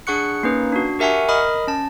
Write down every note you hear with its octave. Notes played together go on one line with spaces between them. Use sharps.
D4 G#4 F#5 C#6 F#6 C#7
A#3 C#4 D#4 B4
D4 F#4
G4 A#4 E5 F#5 G#5 C#6
A#4 D#5 B5 D#6 F6
C#4 A5